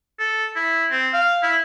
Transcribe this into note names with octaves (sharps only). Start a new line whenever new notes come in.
A4
E4
C4
F5
E4